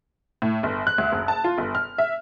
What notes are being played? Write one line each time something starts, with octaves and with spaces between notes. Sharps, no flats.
A2
G1
F#6
D2
F#1
A5
F4
G1
F6
E5